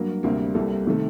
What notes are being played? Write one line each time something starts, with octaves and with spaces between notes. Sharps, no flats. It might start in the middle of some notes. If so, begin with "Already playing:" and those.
Already playing: G2 F#3 A#3
D2 C3 G3 A#3
C2 C3 G3 A#3 A4
C3 D#3 A3